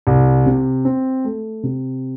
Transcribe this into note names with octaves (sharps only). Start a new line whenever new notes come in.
C2
C3
C4
A3
C3